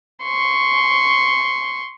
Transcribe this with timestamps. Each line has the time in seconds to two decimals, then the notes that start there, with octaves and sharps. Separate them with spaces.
0.24 C6 C#6